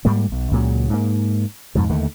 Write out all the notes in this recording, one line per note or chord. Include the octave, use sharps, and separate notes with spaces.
G#2 G3 A#3
B1
C#2 A#2 C#3 F#3
G#2 A#3
F2 G#2 B2
D#2 D3 D#3 A3